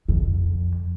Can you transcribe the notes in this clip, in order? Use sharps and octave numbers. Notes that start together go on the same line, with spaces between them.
F2